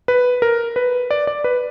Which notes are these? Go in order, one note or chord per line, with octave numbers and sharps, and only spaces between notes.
B4
A#4
B4
D5
D5
B4